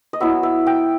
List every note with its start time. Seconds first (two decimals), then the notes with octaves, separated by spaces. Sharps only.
0.13 D#5
0.21 F#3 B3 E4 E5
0.43 E5
0.67 G5